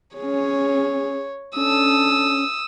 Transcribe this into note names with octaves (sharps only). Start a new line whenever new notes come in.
C#4 G#4 C#5
C#4 D4 A4 D#6 E6